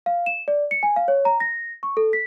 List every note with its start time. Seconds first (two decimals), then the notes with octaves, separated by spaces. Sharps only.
0.06 F5
0.26 E7
0.48 D5
0.71 C#7
0.83 G#5
0.96 F5
1.08 C#5
1.25 A#5
1.40 A#6
1.83 C#6
1.97 A4
2.13 B6